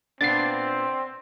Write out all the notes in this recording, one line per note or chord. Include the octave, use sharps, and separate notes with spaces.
A#2 B3 C4 D4 A6 C7